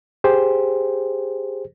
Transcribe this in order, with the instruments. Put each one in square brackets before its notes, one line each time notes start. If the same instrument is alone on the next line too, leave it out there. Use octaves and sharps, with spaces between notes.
[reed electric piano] G4 G#4 C5